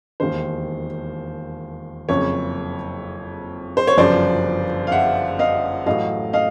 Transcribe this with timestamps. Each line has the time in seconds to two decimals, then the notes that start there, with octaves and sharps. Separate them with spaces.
0.20 E1 D#2 D#3 C5
2.09 F#1 F2 C#3 C#5
3.77 C5
3.87 C#5
3.97 G1 F#2 C#3 F3 C5 D5
4.87 F5
4.92 E5 F#5
5.39 D#5 F5
5.86 A1 A2 F#3 A3 D#5 F5
6.33 D#5 F5